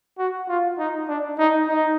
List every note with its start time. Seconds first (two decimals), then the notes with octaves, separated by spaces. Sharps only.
0.19 F#4
0.49 F4
0.79 D#4
1.09 D4
1.39 D#4
1.68 D#4